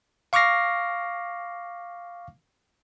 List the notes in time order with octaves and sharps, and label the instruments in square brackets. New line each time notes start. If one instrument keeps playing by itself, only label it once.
[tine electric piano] F5 C#6 D6 F6 A#6 C7